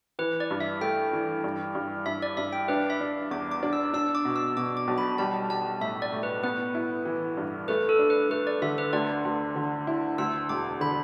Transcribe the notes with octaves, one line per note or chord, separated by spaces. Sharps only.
E3 B4
D5
G2
E5
A3 G5
E3
G2
G2
G2 E5
D5
G2 E5
G5
D4 B4
E5
D4
E2 D6
D6
D4
E6
D4 E6
D6
B2
E6
B2 D6
D6
B1
B5
G3 A5
G3 A5
A2 E5
D5
A2
B4
B3 B4
E4
E3
G2
A3 B4
A4
D4
B4
A3 B4
D5
D3 E5
B4
D2 D5
D2
D3
E4
D2 E6
E1 D6
D3 B5